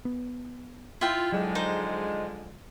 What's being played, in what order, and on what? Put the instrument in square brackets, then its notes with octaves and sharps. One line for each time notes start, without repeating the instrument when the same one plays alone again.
[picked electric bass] B3
[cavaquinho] E4 G5 [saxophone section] F4
[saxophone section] D3 F3 G#3 [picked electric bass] F#3
[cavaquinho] D#4 C5